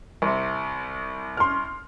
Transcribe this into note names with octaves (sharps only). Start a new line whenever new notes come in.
C2 C3
C6 F6